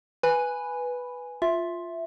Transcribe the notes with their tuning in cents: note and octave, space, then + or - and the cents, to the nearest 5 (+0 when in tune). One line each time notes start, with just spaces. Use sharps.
B4 +0 G#5 +0 B5 +0
F4 +5 E5 +5